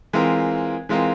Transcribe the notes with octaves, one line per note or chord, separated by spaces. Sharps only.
E3 G#3 C4 F4 A#4
E3 G#3 C4 F4 A#4